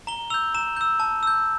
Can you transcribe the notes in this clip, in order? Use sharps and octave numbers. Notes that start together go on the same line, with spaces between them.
A#5 G7
E6 G6 F7
A#5 E7
E6 G6
A5
E6 G6